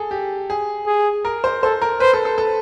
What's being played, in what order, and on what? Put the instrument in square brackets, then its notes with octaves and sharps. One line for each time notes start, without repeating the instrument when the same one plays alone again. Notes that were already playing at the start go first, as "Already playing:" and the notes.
Already playing: [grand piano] G#4 A4
G4
G#4
[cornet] G#4
[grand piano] A#4
C5
[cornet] A4 [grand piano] C5
[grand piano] A#4
[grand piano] B4 [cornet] C5
[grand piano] A4
A4
A4